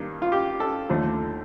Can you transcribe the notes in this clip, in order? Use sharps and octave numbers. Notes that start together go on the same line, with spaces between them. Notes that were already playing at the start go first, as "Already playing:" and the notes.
Already playing: G2 D#3 G3 A#3 D4
F4
G4
A4
D#2 D3 F3 A3 D4